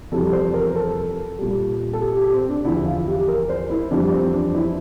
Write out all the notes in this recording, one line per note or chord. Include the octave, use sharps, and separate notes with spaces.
F2 C3 E3 G3 A4
C5
A#4
A#4
A4
A#2 G3
A4
G4
G4
C4
D4
E2 D3 F3 E4
F4
G4
A#4
C5
E4
F2 E3 G3 D4
C4
D4
E4